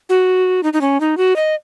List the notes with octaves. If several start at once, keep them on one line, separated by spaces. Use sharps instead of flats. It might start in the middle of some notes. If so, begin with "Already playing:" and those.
F#4
D#4
D#4
C#4
D#4
F#4
D#5